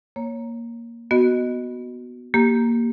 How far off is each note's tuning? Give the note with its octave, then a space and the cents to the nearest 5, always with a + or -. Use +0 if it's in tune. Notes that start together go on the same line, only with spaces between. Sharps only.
A#3 +0 C#5 +0
B3 -5 F#4 +0 D#5 +0
A#3 +0 G4 +0